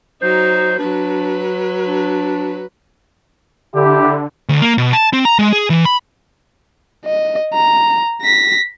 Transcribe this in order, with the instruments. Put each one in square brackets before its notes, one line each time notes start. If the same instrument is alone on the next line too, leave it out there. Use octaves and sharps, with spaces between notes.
[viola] F#3 D#4 [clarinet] C5
[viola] F#3 B4 [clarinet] D4
[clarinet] D4
[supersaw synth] D3 [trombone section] E4 G4
[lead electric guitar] D2
A#3
B2
A5
C4
A#5
G#3
G#4
E3
B5
[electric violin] D#5
A#5
A#6 B6